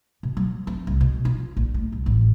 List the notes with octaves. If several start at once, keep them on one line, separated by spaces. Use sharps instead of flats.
B2
F#3
C4
C2
B2
F4
A#1
A3
C2
A1